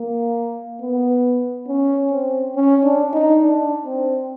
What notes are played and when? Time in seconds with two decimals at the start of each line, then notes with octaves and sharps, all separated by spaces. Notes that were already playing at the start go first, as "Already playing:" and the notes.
Already playing: A#3
0.81 B3
1.68 C#4
2.12 C4
2.56 C#4
2.84 D4
3.14 D#4
3.43 D4
3.86 C4